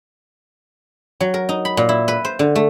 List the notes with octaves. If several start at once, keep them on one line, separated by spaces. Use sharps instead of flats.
F#3
A#4
D#4
B5
A#2
E4
B4
C5
D3
A3